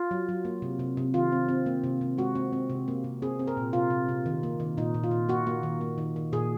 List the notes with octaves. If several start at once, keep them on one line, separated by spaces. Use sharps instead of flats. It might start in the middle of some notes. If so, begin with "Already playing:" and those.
Already playing: F4
F#3
F#3
A#3
C3
C3
C3
D#3 F4
C4
C4
A#3
C3
C3
G#3 F#4
C4
C4
C3
A#3
C3
C4 G#4
C4
A#4
A#2
C3 F4
C3
C3
D#3
A#3
D#3
A#2 D#4
A#2
F4
A#2
A#3 F#4
A#3
D#3
A#3
D#3
D#3
A#2 G#4